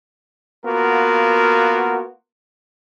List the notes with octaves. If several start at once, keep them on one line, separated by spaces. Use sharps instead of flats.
A#3 B3 F4 F#4 A#4